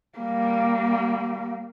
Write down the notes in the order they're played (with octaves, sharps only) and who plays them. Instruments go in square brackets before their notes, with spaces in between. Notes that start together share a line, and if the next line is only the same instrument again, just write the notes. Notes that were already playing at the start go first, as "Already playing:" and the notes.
[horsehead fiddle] G3 A#3